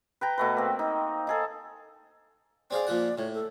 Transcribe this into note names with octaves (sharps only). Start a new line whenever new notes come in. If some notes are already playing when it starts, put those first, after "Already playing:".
B4 G5 A#5
B2 A3 B4
A#3 C4
D#4
D#4 G#4 A4
C4 G#4 D5 F5
A#2 F3 F#5
A2 C#5
A4